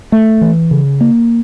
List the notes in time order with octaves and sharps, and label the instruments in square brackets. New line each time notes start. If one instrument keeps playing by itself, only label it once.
[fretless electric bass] A3
E3
C#3
A#3